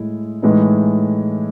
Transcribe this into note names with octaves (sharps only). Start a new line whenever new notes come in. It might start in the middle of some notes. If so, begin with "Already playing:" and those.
Already playing: A2 G#3 E4
A2 E3 G#3 D#4